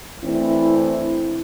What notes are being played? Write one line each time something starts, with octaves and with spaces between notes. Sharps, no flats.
E3 A3 C4 D4 E4